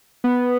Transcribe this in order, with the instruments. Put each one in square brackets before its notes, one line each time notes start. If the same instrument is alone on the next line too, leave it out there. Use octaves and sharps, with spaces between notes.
[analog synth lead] B3